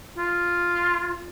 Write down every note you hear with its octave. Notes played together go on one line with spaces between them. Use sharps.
F4